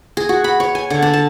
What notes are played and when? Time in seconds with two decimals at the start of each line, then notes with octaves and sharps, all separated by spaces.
0.17 G#4
0.29 F#4
0.44 B5
0.60 C#5
0.75 G#5
0.90 D3
1.02 D4
1.13 A5